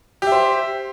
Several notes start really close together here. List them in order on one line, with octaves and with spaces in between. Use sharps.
G4 E5 C5